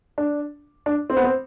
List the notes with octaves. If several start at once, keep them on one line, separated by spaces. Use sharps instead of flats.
D4
D4
C4
B3
C4